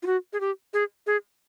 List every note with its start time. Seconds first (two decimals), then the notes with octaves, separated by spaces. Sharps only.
0.03 F4
0.06 F#4
0.33 G#4
0.40 G4
0.74 G#4
1.07 G#4